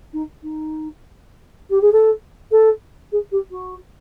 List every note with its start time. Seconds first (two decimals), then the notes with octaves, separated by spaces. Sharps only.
0.13 D#4
0.43 D#4
1.70 G4
1.81 G#4
1.92 A4
2.51 A4
3.12 G#4
3.32 G4
3.51 F#4